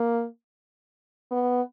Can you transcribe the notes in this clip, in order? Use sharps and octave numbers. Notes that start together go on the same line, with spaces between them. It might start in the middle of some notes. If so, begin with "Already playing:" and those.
Already playing: A#3
B3